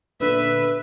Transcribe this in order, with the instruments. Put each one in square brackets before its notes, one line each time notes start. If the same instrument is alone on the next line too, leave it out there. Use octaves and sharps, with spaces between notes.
[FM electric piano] A#2 D3 B3 [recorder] B4 [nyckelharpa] E5